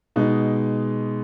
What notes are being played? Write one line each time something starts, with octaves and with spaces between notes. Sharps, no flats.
B2 G#3 D#4